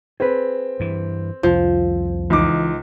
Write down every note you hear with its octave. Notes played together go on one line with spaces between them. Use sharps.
C4 G#4 B4
G2 E3
C2 F2 F3
C#2 E3 D#4 D6